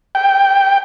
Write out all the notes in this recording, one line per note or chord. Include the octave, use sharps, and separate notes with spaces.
G5